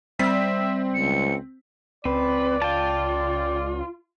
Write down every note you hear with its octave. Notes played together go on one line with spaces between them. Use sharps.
G3 C4 E5 B6
C#2 C#7
C#2 C4 B4 D5
F4 G5 A5